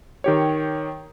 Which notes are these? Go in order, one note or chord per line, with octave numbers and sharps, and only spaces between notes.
D#3 G4 C#5